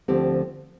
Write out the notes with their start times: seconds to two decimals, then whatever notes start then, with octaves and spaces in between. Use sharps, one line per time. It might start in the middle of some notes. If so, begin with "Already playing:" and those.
0.08 D2 D3 F3 C4 G4